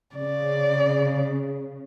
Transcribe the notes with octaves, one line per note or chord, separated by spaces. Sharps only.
C#3 D5